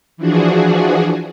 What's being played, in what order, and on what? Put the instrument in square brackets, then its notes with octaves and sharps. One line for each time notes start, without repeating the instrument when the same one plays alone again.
[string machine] E3 F3 D4 F#4 G#4